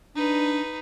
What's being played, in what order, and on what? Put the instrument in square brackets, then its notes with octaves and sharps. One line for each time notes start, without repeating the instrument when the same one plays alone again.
[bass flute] D4 [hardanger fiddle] D#4 B4